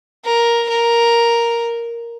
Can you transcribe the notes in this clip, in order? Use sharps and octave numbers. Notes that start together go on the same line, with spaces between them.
A#4
A#4